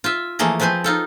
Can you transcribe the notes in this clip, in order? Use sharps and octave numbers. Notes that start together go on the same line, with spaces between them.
F4 E5
E3 F3 A3 A#3 G#4 D#5
F3 C4 B4 C5 G#5
D#4 F4 A4